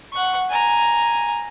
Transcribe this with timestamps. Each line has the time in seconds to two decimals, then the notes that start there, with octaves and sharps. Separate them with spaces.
0.13 F#5 C#6
0.50 G#5 A#5